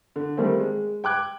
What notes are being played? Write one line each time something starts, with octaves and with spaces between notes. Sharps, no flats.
D3
D#3 G3 A3 A#3 C4
G#3
G5 D6 F#6 G#6